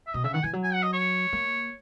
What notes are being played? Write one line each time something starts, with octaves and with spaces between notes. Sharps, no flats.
E5
B2 D#5
C#3 E5
D#3 F#5
E3 G#5
F#3
G#5
F#5
D#5
C#5
A#3